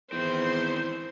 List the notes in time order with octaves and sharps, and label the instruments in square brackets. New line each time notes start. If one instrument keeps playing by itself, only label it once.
[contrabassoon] E2 [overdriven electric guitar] D#3 C4 [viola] C5